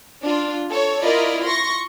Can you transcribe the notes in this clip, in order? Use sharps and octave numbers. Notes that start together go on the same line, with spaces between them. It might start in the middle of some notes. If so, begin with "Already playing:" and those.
D4 F4
A4 C#5
E4 F4 A#4 D5 D#5
C6 C#6 A#6